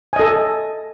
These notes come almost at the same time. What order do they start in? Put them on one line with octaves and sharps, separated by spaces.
G#5 D#5 A4